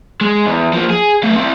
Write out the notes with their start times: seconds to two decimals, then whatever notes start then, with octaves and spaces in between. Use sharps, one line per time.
0.21 G#3
0.46 E2
0.73 F3 A#3
0.90 G#4
1.23 A3 F5
1.36 C4 E4